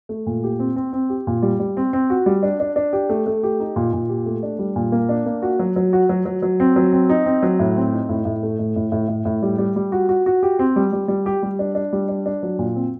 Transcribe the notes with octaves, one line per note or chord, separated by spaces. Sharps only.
A3
A#2
G4
C4
C4
C4
G4
A#2
G3
G3
C4
C4
F#4
G3
D4
D4
D4
G4
A3
A3
G4
D#4
A#2
A#2
G4
A3
D4
G3
A#2
A#3
D4
A#3
F#4
F#3
F#3
F#4
F#3
F#3
F#3
C4
F#3
C4
D#4
C4
F#3
A2
C4
D#4
A2
A2
A3
A2
A2
A2
A2
A2
G3
G3
G3
F#4
F#4
F#4
G4
C4
G3
G3
G3
G4
G3
D4
D4
G3
D4
D4
F#3
A#2
C4